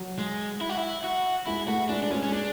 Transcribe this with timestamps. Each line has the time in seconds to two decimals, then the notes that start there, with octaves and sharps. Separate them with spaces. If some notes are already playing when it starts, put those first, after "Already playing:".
Already playing: F#3
0.19 G#3
0.61 E4
0.69 F#4
0.77 E4
1.04 F#4
1.47 G#3 E4
1.68 A3 F#4
1.89 G#3 D4
2.03 D4
2.11 G#3 C#4
2.23 C#4
2.31 G#3 D4